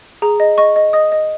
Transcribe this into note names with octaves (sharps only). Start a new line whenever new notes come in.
G#4 A#5
D#5
D#5 C#6
D#5
D#5 D#6
D#5